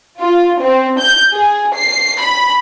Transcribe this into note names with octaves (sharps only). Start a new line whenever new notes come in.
F4
C4
G6
G#4
C7
B5